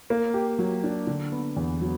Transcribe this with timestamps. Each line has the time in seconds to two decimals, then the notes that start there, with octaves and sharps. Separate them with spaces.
0.10 A#3
0.34 G4
0.59 F#3
0.84 D4
1.07 D3
1.32 B3
1.56 E2
1.81 F#3